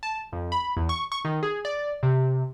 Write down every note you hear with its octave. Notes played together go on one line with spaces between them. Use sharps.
A5
F2
B5
E2
C#6
C#6
D#3
G#4
D5
C3